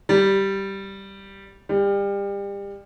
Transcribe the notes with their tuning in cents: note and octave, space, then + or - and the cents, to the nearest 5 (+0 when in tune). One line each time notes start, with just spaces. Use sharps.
G3 -5
G3 +30